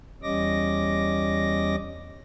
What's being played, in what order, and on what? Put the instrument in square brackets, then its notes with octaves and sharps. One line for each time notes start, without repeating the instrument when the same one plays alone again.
[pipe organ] E2 G3 C#4 D#5 D6 A#6